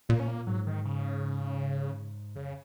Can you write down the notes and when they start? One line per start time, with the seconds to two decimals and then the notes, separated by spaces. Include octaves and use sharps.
0.09 A#2 A#3
0.20 C#4
0.28 A#3
0.47 G#2 F#3
0.67 D#3
0.85 C#3
2.36 F#2 C#3